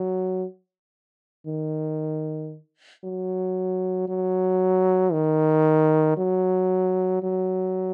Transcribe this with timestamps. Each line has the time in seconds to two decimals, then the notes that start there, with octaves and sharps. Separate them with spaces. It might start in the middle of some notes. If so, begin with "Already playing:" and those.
Already playing: F#3
1.47 D#3
3.04 F#3
4.08 F#3
5.12 D#3
6.17 F#3
7.23 F#3